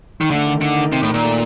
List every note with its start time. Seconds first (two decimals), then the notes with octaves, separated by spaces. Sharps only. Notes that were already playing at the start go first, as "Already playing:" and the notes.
0.21 D#3
0.30 D3 A3
0.47 D#3
0.61 D3 D#4
0.77 D#3
0.93 C3 D#4
1.02 A2
1.08 D#3
1.14 A#2
1.24 A3